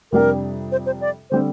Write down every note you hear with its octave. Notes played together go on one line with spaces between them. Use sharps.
F2 C3 G3 D4 G4 A#4
C5
C5
D5
D3 G3 C4 C5